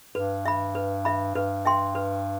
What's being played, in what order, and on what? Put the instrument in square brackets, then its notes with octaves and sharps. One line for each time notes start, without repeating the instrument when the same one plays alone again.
[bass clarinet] G2 [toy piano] B4
[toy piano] E5 B5
B4
E5 B5
[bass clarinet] G2 [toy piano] B4
[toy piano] E5 G5 C6
B4